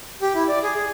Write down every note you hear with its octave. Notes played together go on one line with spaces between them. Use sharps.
G4
E4
D5
G#4
G#4